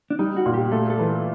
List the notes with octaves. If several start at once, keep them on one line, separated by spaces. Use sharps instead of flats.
D4
G3 D#4
F#4
A#2
G4
A3 A4
A4
E3